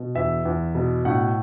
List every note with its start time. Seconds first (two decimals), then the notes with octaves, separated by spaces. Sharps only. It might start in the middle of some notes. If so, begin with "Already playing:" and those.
Already playing: B2
0.15 E2 E5
0.45 E2
0.75 B2
1.05 A2 F#5